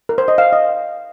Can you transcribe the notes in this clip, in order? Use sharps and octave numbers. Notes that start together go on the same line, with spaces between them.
A#4
C5
D#5
F5
D#5